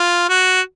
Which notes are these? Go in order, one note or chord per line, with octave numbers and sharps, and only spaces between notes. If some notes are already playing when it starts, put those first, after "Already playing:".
Already playing: F4
F#4